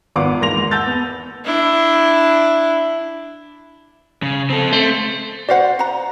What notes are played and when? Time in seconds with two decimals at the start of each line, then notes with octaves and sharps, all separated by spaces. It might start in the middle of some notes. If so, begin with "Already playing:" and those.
0.16 G#1 B3 F4 F5 F#5 D6
0.41 E2 G#2 A#3 C6 A#6 F7
0.71 F#5 A5 E6 G6 A6
0.86 B3
1.45 D4 E4
4.22 C#3
4.50 C4 A4
4.73 A3 C4 C5
5.49 F#4 C5 D5 F5 F#5
5.79 F#5 A#5